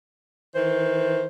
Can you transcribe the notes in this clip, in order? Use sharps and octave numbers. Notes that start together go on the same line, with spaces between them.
D#3 E3 C5